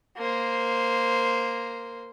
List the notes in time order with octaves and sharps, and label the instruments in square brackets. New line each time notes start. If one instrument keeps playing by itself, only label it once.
[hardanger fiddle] A#3 C5